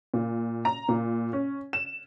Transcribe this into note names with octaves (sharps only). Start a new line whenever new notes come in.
A#2
A#5
A#2
C#4
E7